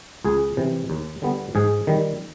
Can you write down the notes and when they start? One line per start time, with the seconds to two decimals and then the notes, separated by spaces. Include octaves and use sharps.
0.24 C#2 G#4
0.57 C3 E3
0.90 D#2
1.22 D3 G3 B3
1.55 G#2 G#4
1.87 D#3 G3